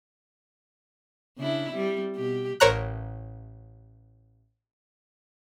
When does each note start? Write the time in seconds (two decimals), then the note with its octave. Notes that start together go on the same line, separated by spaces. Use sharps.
1.38 C#3 D4 E4
1.72 G3 C4
2.16 B2 G4
2.60 A1 A#4 C5 C#5 A#5 F#6